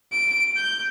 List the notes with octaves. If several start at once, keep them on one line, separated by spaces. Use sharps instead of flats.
D7
G6